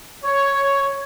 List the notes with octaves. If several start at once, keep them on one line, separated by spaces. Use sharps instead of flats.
C#5